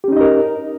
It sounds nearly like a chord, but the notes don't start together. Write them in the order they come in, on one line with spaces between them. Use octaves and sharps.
G4 C#4 D#4 D#5 A#4